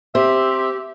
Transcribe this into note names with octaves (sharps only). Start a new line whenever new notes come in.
C4 G4 E5